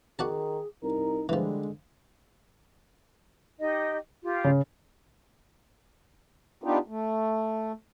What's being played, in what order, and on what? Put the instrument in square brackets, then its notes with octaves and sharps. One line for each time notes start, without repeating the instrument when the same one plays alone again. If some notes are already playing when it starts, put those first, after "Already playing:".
[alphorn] D#3 [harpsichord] F#4 D5 A5 [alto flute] G#4
[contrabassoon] C2 [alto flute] D#4 [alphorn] A#4
[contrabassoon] D3 [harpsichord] E3 F3 [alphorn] G3 [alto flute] G#3
[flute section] D#4 G4 D#5
F4 G4
[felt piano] C#3
[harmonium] B3 D4 D#4 F4 G4
A3